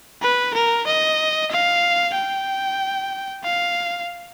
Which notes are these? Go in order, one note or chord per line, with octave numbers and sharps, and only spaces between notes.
B4
A#4
D#5
F5
G5
F5